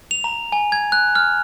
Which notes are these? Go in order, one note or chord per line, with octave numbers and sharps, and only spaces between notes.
F7
A#5
G#5
G#6
F#6
F6